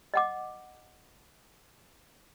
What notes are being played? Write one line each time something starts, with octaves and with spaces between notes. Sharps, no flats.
D#5 F#5 D6